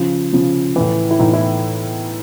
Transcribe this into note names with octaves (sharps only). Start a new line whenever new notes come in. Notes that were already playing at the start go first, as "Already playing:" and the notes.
Already playing: C#3 F3
C#3 F3
A2 E3
E4
A2 E3 D#4
E4